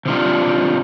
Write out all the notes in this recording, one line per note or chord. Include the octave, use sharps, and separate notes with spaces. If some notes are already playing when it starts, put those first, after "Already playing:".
C3 D#3 G3 D4 F4